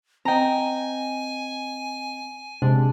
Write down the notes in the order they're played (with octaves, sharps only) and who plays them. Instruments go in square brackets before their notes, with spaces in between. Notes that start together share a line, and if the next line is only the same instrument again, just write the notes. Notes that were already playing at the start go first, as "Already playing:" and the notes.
[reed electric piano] C4 D#5 [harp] G5 A#5 [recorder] G#5
[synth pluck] C3 [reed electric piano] G#3 [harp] D4